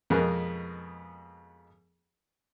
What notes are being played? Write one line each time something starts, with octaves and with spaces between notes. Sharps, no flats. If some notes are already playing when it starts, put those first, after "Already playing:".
F2 B2 G#3 B3 G#4 A#4